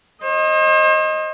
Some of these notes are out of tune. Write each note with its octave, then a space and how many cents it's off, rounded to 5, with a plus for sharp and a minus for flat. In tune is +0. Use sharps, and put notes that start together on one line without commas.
C5 +40 D#5 +0